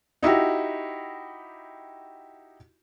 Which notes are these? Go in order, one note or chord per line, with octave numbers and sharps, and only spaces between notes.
D#4 E4 F#4 G4